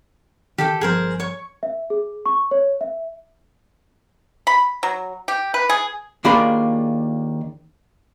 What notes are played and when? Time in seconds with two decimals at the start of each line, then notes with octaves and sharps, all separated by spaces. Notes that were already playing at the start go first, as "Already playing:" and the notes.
0.58 D#3 G4 A4 G5
0.81 G1 F3 G#4 A#4 C5
1.20 C#5 C#6
1.63 E5
1.90 G#4
2.26 C#6
2.51 C#5
2.81 E5
4.47 B5
4.83 F#3
5.28 G4
5.54 B4
5.69 G#4
6.25 D#2 A#3 D4 F4 G#4 B5